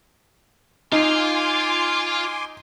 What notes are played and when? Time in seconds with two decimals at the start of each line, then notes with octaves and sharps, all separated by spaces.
0.92 D#4 F4 F5 G#5 C6 D6